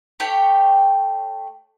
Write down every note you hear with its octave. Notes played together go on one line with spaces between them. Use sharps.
A3 G4 C#5 G5